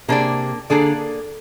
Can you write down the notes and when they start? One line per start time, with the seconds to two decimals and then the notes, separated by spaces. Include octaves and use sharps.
0.08 C3 A#3 D4 G#4 D5
0.70 D3 A#3 D4 G#4 D5